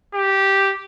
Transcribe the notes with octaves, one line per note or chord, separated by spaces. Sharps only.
G4